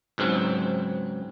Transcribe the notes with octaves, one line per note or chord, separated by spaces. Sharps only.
C#2 G#2 F#3 C4